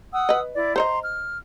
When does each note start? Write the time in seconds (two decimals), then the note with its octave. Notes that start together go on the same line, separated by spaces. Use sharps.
0.12 F#5 D#6 E6
0.29 B4 D#5
0.55 E4 D5
0.76 C5 C#5 D#5 A#5 C6
1.03 F6